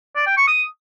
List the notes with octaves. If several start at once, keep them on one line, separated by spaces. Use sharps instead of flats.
D5
G5
C#6
D#6